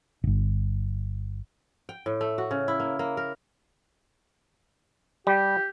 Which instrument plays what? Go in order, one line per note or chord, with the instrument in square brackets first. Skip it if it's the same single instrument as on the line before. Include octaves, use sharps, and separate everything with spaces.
[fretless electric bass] D1 G1
[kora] G5
A2
A3
F#4
C#3
E4
A#3
A#3
A#4
[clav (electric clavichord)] G3 [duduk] G4